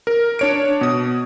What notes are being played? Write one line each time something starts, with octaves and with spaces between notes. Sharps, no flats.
A#4
D4 C#5 D7
B2 D#6